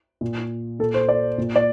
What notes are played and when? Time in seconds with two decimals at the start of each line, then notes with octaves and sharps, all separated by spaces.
0.21 A#2
0.79 A#2 A4
0.94 C5
1.09 D5
1.38 A#2
1.56 D5